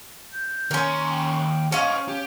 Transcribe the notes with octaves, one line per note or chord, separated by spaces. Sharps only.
G6
D#2 C#4 A#4 C6
G5
C#4 C5 D#5 F5 C#6
G4